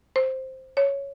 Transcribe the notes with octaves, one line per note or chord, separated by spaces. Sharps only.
C5
C#5